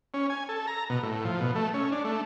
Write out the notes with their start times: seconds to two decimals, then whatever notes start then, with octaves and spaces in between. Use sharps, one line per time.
0.14 C#4
0.30 G#5
0.49 A4
0.67 A#5
0.90 B2
1.03 A2
1.25 F3
1.40 B2
1.55 A3
1.74 C#4
1.92 D4
2.04 A3